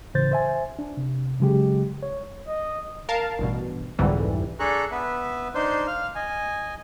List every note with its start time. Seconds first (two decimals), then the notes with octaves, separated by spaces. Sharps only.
0.14 A2 C#3 E3 C5 G6 A6
0.31 C5 E5 G#5
0.79 D4
0.97 C3
1.40 C#3 F#3 G#3 G4
2.03 C#5
2.48 D#5
3.09 A#4 F5 A5
3.39 A1 G2 B2
3.99 C2 F2 G#2 D3 E3 G3
4.59 D4 G#4 A4 A#5 C#6 F#6
4.91 B3 B4 E5
5.55 D4 D#4 C5 C6
5.87 F5 F6
6.15 D#5 G#5